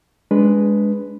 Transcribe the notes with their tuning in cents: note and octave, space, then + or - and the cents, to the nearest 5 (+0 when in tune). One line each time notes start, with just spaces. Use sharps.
G#3 +0 D4 -20 B4 +0